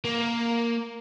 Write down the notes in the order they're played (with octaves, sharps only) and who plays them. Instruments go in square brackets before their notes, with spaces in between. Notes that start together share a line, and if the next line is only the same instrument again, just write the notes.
[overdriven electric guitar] A#3